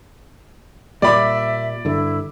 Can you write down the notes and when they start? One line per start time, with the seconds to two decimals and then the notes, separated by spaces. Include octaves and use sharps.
1.02 A#2 G3 D5 E5 B5 D6
1.85 G2 D3 E4